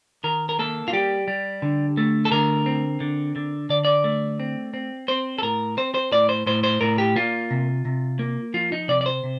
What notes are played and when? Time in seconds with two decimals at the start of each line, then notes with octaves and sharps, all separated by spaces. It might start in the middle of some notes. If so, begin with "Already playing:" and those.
0.24 D#3 A#4
0.49 A#4
0.59 A#3 A4
0.88 F4
0.93 G3 G4
1.28 G3
1.62 D3
1.97 A3
2.25 A4
2.31 D3 A#4
2.66 C4
3.00 D3
3.36 D3
3.69 D3 D5
3.85 D5
4.04 A3
4.40 C4
4.74 C4
5.08 C4 C5
5.38 A4
5.42 A2 A#4
5.77 C4 C5
5.94 C5
6.12 A2 D5
6.29 C5
6.46 A2 C5
6.64 C5
6.81 A2 A#4
6.98 G4
7.16 A#3 F4
7.50 C3
7.85 C3
8.19 A#3
8.54 F3 F4
8.72 D#4
8.88 C3 D5
9.01 D5
9.06 C5
9.24 C3